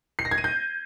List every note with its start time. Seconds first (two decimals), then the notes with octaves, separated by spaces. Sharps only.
0.19 C7
0.25 A#6
0.31 G#6
0.38 D#7
0.44 G6